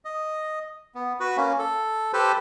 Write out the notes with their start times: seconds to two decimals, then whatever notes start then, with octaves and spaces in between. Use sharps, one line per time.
0.05 D#5
0.95 B3
1.20 F#4 B4
1.37 A#3 C#4
1.59 A4
2.13 G4 A4 B4 C5